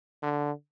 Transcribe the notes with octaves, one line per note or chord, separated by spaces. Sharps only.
D3